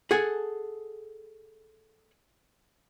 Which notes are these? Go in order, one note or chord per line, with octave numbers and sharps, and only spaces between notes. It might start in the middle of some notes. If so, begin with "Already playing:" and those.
G#4 A4 F#5 G#5